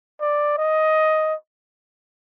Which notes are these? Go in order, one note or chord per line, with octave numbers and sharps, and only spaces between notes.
D5
D#5